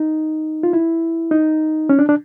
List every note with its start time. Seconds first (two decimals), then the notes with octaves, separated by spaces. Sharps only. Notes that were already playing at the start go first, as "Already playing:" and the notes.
Already playing: D#4
0.63 F4
0.73 E4
1.31 D#4
1.89 C#4
1.99 D4
2.09 D4